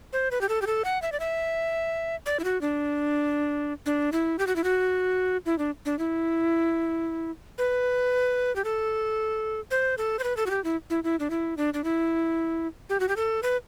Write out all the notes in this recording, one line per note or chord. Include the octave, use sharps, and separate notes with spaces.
C5
B4
G4
A4
G4
A4
F#5
E5
D5
E5
D5
E4
F#4
D4
D4
E4
G4
F#4
E4
F#4
E4
D4
D4
E4
B4
G4
A4
C5
A4
C5
B4
A4
F#4
G4
E4
E4
E4
D4
E4
D4
D4
E4
G4
F#4
G4
A4
B4